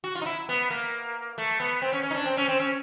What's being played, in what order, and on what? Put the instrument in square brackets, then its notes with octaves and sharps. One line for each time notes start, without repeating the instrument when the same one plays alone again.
[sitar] F#4
F4
D#4
E4
B3
A#3
A3
B3
C4
C#4
C#4
D#4
D4
C4
C#4
C4
C#4